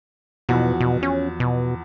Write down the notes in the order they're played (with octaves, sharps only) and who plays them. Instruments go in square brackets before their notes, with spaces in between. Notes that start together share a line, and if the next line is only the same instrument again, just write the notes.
[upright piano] E2 F3 F#4 [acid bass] B2
[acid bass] B2
C#4
B2